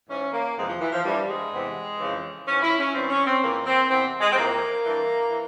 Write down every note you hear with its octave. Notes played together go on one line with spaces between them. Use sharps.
G#2 E3 C#4
A#3
F2 C3 E3 G#3
F3
E3
F3
G2 E3 G3
G#3
E2 C3 E3
F2 C#3 E3
G#2 E3 C#4
E4
C#4
G2 E3 C4
C#4
C4
F2 C#3 E3 A#3
C4
E2 C3 E3 C4
G#3
C4
F2 E3 A#3
G2 E3
E3